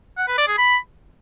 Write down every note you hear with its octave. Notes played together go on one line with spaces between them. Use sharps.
F#5
B4
D5
G#4
B5